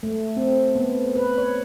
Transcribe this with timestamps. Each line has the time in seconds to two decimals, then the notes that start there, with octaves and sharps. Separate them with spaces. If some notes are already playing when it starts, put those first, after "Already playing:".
0.03 A3
0.37 C4
0.75 B3
1.16 B4
1.38 C#5